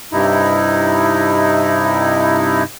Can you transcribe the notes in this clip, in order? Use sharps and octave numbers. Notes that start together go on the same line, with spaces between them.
G2 C3 D#4 E4